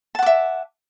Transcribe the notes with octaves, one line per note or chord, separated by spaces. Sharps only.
E5 F#5 A5 D6